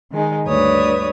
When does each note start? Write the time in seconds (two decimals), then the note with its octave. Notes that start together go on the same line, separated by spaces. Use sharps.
0.12 D#3 G#3 D#4
0.47 D2 G2 B4 C#5 D5 D#6